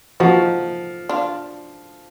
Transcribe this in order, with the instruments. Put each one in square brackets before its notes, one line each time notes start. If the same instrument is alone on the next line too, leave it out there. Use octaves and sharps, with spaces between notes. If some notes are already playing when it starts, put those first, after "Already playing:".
[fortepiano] F3 [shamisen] D#4 F#4
[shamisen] D4 F4